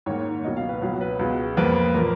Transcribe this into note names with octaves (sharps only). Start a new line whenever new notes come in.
G#2 D#3 A#3 C#5
C#2 B2 F#3 A#3 D#5
F5
B4
C#2 B2 F#3 B4
B4
C#2 B2 G#3
F2 F3 A#3 B4
A#2 F3 A#3 A#4